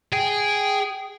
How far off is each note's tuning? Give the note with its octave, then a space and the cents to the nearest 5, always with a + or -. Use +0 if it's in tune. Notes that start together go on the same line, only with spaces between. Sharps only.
G#4 -5 G5 -15